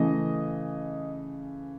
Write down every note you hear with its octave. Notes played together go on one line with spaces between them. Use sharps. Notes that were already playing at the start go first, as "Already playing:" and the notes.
Already playing: C#3 E3 A3 D#5